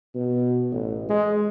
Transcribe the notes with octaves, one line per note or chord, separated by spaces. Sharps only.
B2
A1
G#3